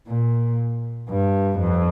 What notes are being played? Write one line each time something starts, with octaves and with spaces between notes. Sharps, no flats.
A#2
G2
F2